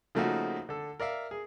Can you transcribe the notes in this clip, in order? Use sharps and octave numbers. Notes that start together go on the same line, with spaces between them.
C#3 F3 A3 A#3 D#4 F#4
D3 A4
A#4 D5 E5 F5
G#4